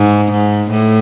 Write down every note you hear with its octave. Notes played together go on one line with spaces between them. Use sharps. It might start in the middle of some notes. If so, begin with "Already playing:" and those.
Already playing: G#2
G#2
A2